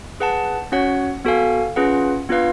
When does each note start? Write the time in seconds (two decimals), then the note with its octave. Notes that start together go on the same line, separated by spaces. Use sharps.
0.20 G#4 B4 F#5 A5
0.72 C#4 F#4 C#5 F#5
1.25 B3 F#4 A4 F5 G#5
1.76 C#4 F4 G#4 B4 F#5
2.29 B3 D4 F4 B4 F5